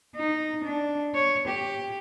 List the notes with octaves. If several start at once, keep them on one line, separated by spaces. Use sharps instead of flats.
D#4
D4
C#5
G4